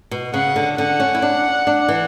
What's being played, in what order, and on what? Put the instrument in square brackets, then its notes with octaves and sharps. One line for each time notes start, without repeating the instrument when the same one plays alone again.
[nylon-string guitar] B2
[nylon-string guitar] C#3 [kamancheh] F#5
[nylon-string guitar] D3
[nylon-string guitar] D3 [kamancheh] F#5
[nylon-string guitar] C#4
E4
D4
D4
E3